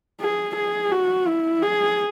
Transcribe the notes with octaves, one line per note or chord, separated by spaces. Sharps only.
G#4
G#4
F#4
E4
G#4